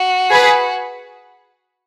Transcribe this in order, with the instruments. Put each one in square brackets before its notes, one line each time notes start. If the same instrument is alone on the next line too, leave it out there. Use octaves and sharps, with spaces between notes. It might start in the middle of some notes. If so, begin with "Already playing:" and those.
Already playing: [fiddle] F#4
[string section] G#4 B4